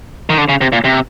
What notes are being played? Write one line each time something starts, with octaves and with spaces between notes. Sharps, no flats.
D#3
D3
C#3
C3
A#2
C3